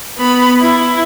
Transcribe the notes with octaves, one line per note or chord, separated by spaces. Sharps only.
B3 B5
E4